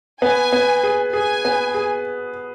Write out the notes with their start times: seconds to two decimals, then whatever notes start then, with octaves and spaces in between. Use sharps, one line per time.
0.22 B3 G#5
0.53 B3
0.84 G#4
1.13 G#4 G#5
1.45 B3
1.75 G#4